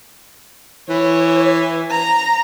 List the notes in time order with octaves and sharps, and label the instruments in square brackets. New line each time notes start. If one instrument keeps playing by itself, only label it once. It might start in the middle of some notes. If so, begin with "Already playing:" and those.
[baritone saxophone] E3 [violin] C#5
[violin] A#5